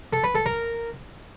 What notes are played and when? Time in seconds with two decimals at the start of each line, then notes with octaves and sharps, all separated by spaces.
0.13 A4
0.24 B4
0.35 A4
0.46 A#4